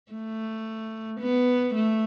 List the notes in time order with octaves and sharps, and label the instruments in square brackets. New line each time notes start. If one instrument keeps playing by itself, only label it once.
[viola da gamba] A3
B3
A3